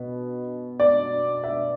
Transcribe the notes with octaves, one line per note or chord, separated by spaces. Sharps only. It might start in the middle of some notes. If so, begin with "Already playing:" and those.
Already playing: B2 B3
D5
E5